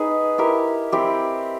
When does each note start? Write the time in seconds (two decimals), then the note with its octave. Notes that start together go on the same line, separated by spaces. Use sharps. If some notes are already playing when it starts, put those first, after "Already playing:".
Already playing: D#4 G#4 B4
0.38 E4 G4 A#4
0.92 C4 E4 G4